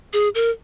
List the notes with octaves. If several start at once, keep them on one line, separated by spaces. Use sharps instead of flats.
G#4
A#4